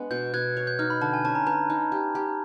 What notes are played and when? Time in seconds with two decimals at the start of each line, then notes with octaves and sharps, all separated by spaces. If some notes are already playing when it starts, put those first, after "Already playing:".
Already playing: G#3 B3 D4
0.11 B2 G6
0.34 B2 F#6 G#6
0.57 C#5
0.67 G6
0.79 D#4 F6
0.90 B5
1.01 D3 A5
1.14 G#5
1.25 C#4 A5
1.35 A#5
1.47 B4 A#5
1.70 D#4
1.92 G4
2.15 G4